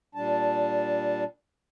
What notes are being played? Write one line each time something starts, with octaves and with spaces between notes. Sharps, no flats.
A#2 G3 D4 A5